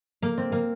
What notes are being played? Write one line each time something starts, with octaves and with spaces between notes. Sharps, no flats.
A#3
C4
A#3